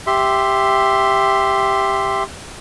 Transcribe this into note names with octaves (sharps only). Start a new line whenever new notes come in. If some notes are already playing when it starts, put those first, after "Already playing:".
G4 E5 C6